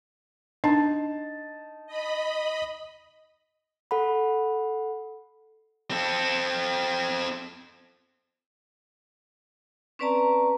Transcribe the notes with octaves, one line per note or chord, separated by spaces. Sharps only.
D4 D#4 A5
D#5 B5
A4 F#5 B5
C4 A4
C4 C#4 B4 D5 A5 A#5